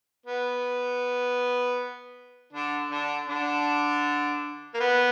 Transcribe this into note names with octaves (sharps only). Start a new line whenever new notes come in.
B3
D3 D4
D3 D4
D3 D4
A#3
B3